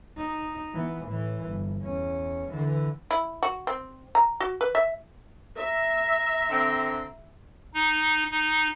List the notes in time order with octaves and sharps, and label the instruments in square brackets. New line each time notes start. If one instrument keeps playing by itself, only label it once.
[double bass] D#4
E3 B3
A2 E3
G1
E2 C#4
D3 E3
[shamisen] E4
F#4
C4
A#5
F#4
B4
E5
[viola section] E5 [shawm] A#5
[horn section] D3 C4
[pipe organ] D#4
D#4